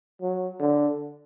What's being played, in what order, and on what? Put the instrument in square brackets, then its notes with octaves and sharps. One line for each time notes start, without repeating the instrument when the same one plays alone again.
[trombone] F#3
D3